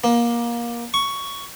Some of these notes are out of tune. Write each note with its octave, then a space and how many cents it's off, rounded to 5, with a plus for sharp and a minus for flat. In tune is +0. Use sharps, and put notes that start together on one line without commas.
A#3 +20
C#6 +10